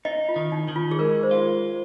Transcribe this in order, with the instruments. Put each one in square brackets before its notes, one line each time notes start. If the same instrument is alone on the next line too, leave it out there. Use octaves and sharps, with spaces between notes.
[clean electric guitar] D#4 [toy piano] D#5
[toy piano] F4
[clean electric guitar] D#3
[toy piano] D#4
[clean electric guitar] D#3 [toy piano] D#4
[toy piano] F4
G#4
[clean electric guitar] G#3 [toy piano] A#4
[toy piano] C5
[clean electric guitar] F4